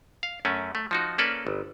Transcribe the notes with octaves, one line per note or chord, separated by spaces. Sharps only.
F5
F#2 A3 C#4
A3
F3 D#4 F#4
A#3 C#4 A4 B4 D5
G1